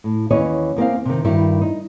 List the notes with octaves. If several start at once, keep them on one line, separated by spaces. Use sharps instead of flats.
A2
D#2 E3 C#4 C#5 D#5
E2 A#3 C4 F5
C3 D#3
G2 D#3 E4 F#4
D#4